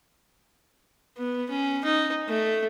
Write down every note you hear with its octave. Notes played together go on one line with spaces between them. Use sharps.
B3
C#4
D#4
A3